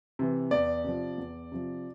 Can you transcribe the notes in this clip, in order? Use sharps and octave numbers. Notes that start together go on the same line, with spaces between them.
C3 E3
E2 D5
C3 F3
E2
C3 F3